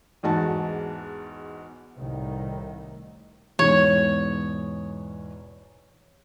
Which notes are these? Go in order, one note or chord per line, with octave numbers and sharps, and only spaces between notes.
E2 G#2 F#4 A5
C2 A2 D#3
E2 G#2 B2 C#5